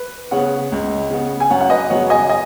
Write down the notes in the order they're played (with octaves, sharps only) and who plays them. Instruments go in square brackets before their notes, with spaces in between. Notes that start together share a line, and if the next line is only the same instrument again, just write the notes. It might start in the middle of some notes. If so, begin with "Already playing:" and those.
Already playing: [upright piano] B4
C#3 B3 C#5 F#5
C#2
C#3 B3
G#5
F#2 C#5 F#5
F#5
B4 D#5
C#3 F#3 B3 C#5 F#5
D#5 G#5
D#5 G#5